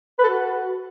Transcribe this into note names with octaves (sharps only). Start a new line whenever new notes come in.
B4
A4
F#4